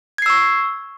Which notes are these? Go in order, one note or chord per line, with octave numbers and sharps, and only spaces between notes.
C#6 E6 G#6 C7